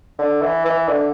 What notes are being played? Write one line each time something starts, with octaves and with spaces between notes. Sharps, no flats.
D3
E3
E3
D3